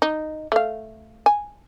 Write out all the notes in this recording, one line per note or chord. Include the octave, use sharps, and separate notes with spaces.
D#4
A3 F5
G#5